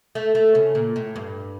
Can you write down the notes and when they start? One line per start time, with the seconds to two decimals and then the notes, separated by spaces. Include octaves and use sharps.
0.15 A3
0.35 A3
0.55 C#3
0.75 A#2
0.96 A2
1.16 G2